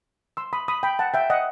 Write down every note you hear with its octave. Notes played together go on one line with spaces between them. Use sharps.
C6 E6
B5 D#6
B5 D#6
G5 B5
F#5 A5
E5 G5
D#5 F#5